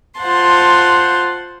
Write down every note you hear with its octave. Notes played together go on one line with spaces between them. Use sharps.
F4 C5 F#5 A5 C6